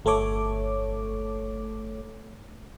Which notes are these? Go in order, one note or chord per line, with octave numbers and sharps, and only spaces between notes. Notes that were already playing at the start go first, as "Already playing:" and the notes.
G1 A3 A4 C#5 D6